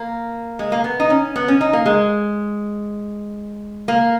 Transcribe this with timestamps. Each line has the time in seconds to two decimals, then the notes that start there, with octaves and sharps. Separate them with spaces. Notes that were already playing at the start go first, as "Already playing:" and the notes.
Already playing: A#3
0.59 G#3
0.72 A#3
0.84 B3
1.00 D#4
1.10 C#4
1.36 B3
1.48 C#4
1.61 D#4
1.73 A#3
1.86 G#3
3.88 A#3